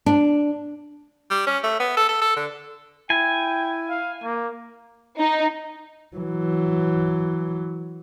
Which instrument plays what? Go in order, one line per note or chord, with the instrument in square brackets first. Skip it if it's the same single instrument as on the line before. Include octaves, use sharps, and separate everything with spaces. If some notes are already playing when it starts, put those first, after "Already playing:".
[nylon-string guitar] D4
[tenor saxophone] G3
C#4
A3
B3
A4
A4
A4
D3
[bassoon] E4 [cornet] G5 [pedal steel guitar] G#5
[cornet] F5
A#3
[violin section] D#4
[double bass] E3 F#3